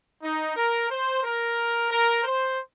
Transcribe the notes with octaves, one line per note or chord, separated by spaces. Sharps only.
D#4
A#4
C5
A#4
A#4
C5